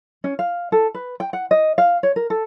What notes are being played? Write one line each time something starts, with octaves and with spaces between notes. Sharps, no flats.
C#4
F5
A4
B4
G5
F#5
D#5
F5
C#5
A#4
A4